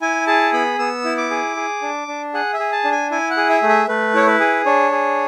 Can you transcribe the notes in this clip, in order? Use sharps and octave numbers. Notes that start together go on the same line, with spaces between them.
E4 G#5
G#4 A5
B3 B5
B3 E6
E4
D6
G#4
G#4
D4
D4
G#4 F#5
E5
G#4
A5
D4
G#5
E4 G#5
F#5
G#4
E5
A3
E5
A3 B4
E4 C#5
B4
G#4
D4 C#5
G#4